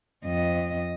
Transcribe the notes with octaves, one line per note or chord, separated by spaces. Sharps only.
F2 D#5